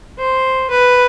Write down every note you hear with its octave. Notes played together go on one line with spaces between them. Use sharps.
C5
B4